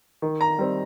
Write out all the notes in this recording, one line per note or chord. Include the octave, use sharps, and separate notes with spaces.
D#3
A#5
G3 C4